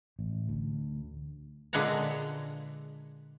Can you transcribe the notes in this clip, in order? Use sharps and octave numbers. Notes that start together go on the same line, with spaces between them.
A1
D2
A#2 D3 G#3 B4 F#5 A#5